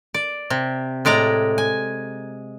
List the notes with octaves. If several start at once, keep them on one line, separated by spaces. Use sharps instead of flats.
D5
C3
A2 G#3 D5 A#5
G#5